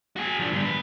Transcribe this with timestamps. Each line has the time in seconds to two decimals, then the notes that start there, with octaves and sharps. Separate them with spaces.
0.16 F#4 G#4
0.39 F3 D4
0.52 G2 D3
0.65 B3 B4